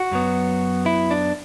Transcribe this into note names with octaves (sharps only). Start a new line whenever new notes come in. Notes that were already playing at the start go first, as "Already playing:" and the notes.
Already playing: F#4
F#2 F#3 B3
E4
D4